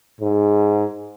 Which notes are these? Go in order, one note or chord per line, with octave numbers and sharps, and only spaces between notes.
G#2